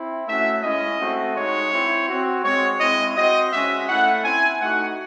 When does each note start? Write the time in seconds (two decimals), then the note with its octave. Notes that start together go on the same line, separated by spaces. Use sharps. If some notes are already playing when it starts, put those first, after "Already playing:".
Already playing: C4 E4
0.28 A3 C#4 F#4 E5
0.63 G#3 C#4 E4 D#5
1.00 A3 C4 F#4
1.36 G#3 D#4 F#4 C#5
1.72 C4 E4
2.08 C4 F#4
2.44 G#3 C4 F#4 C#5
2.80 G#3 C4 E4 D#5
3.16 C4 F#4 D#5
3.52 G#3 C#4 F#4 E5
3.88 A3 C#4 E4 F#5
4.24 C4 E4 G#5
4.61 A3 D#4 F#4 F#5